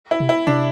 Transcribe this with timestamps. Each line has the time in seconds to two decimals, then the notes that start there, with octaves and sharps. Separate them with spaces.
0.11 E4
0.20 C3
0.29 E4
0.47 C3 D4